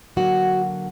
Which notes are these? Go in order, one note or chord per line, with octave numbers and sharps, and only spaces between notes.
D3 F#3 A#3 F#4